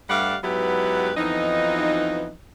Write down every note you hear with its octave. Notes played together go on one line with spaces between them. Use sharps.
G2 G3 A3 D5 F5 F#5
G#2 F#3 B3 E4 G4 B4
F2 E3 F3 B3 D#4